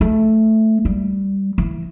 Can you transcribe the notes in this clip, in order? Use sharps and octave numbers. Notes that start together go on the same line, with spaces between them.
A3
G3
E3